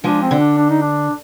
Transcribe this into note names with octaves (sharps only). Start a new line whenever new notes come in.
F3 G#3 D4
C4
D3
D4
D4
D#4
D4